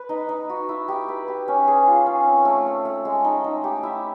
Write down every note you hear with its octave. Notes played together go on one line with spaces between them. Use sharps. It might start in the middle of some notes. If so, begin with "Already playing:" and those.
Already playing: B4
D#4
D#4
F#4
E4
G4
B4
G4
C#4
G#4
F4
C#4
C4
A3
A3
A3
G#3
D#4
D#4
G4
E4